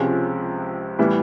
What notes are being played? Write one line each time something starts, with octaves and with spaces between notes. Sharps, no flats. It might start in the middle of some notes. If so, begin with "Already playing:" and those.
Already playing: C#2 C3 F3 G#3 C#4
A2 E3 G3 B3 E4